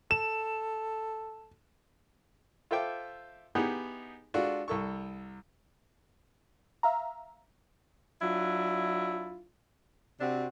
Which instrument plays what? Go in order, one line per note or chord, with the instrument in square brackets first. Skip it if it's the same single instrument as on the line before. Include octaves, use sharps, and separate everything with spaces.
[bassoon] A4 [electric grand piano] E7
[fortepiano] F4 A4 C5 E5 G5 D6
B3 D#4 E4 G4 G#4 F#5
G#3 D4 F4 F#4 A4
C2 A4 C#6
[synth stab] E5 F5 A#5
[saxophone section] F#3 D4 E4 F4
C3 C4 D4 F#4